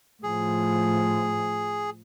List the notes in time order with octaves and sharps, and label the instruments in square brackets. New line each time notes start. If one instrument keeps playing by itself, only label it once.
[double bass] A2 F3 [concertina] G#4